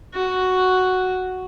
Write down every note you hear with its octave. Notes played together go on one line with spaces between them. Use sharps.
F#4